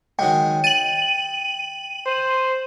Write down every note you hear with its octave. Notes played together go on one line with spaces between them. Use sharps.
D#3 F#3 G#3 G5
A5 D#7 F#7
C5